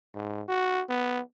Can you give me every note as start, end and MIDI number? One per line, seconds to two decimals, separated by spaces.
0.15 0.43 44
0.48 0.82 66
0.89 1.21 59